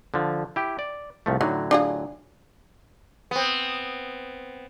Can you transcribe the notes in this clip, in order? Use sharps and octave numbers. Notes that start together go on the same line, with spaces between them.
D3 F3
E4 G4
D5
C2 F3 A3
A2 D3 F#3 D#4
D4 F4 G#4
B3 C4